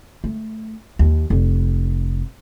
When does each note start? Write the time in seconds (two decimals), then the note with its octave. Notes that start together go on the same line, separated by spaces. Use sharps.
0.24 A3
0.99 D#2
1.30 F1